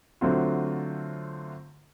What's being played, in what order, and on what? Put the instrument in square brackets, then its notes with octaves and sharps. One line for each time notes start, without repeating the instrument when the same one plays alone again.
[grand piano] D3 F#3 A3 C4 F4